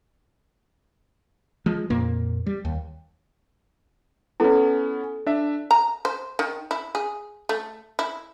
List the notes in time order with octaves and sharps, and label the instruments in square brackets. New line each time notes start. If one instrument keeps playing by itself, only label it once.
[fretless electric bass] F3 G#3
F2 A#2 A#3
G3
D#2
[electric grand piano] B3 C#4 [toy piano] E4 A4
[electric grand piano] D4 E5
[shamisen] A#5
C5
D#3
E4
G#4
A3
E4